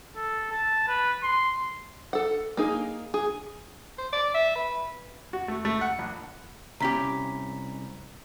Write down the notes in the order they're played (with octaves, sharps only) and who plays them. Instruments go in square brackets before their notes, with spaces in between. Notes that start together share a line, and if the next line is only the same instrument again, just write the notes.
[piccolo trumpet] A4
A5
B4
C6
[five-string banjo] A4 F#5
A#3 D#4 G#4
G#4
[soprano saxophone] C5
D5
E5
B4
[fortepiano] F#4
A3
A3
F#5
A#1
[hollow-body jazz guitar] C2 C#4 G4 [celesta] A#5 B5 B6